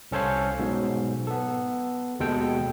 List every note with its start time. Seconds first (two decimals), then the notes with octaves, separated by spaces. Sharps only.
0.11 C2 C#4 A4 C5 C#5 F5
0.59 G#2 B2 F#3
1.27 B3 A4
2.20 D#2 B2 G#3 A4 G5